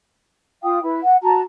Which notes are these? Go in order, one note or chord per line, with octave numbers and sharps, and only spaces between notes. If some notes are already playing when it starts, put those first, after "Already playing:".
F4 F5 G5 D#6
E4 B4
F#5
F#4 A5 A#5